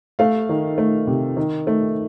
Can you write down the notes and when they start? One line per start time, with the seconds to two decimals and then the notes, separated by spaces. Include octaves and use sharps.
0.19 A3 F5
0.49 D#3
0.78 A3
1.07 C3
1.37 D#3
1.67 A3